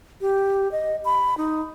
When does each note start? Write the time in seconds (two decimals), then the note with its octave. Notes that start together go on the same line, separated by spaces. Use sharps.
0.21 G4
0.72 D#5
1.05 B5
1.37 D#4